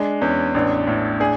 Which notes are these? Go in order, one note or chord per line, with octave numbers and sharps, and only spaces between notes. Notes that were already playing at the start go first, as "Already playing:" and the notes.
Already playing: G#3 D4
E2 C#4
A1 D4
A2
D4 G#4